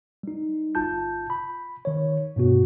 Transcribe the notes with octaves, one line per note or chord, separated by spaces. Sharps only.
G3 D#4
G1 F4 A5 G6
B5
D#3 C#5
G2 B2 B3 F#4